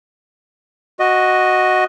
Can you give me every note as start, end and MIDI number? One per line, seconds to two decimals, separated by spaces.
0.99 1.84 66
0.99 1.84 75